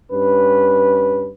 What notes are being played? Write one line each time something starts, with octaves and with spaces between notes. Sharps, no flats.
G2 C#4 B4